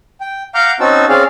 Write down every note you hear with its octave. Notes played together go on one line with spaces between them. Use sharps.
G5
F5 F#5 A#5 D6 F6 G6
C4 C#4 D#4 F#4 A5 E6
C4 C#4 G#4 C#5 D5 F5